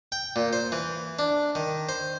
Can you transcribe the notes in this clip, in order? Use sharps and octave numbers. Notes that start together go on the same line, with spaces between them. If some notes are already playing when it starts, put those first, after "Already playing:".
G5
A#2
C5
E3
D4
D#3
C5